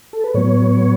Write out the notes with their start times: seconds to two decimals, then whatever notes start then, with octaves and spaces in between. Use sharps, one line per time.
0.13 A4
0.24 B4
0.34 A2 F#3 B3 C#5